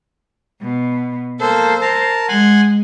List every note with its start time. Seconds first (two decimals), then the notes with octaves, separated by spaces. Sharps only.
0.62 B2
1.40 A#3 A4 C5
1.81 A#4 A5
2.28 G#3 F#5 G#5 C6